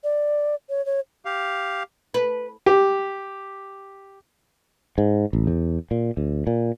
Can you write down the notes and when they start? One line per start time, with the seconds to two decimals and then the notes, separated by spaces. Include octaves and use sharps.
0.04 D5
0.70 C#5
0.86 C#5
1.25 G4 F5
2.14 B4
2.66 G4
4.98 G#2
5.33 A1
5.47 E2
5.91 A#2
6.17 D2
6.47 A#2